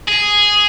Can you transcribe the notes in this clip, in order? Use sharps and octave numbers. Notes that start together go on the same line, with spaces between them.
G#4